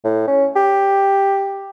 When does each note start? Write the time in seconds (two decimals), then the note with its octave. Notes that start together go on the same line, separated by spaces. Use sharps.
0.04 A2
0.27 C#4
0.56 G4